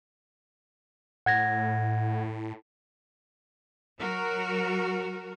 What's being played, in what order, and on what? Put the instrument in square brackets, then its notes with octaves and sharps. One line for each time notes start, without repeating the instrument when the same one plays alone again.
[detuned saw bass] A2 [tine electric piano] F#5 G#6 A#6
[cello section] F#3 F#4 A#4